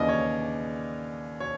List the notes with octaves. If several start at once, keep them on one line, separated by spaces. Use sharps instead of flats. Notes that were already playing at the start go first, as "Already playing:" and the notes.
Already playing: D#2 C#3 E3 D5 D#5
C#5
C#5